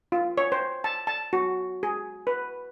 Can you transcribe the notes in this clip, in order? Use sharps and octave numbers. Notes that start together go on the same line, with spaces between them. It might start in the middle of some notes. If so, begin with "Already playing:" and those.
F4
C#5
C5
A5
A5
F#4
G#4
B4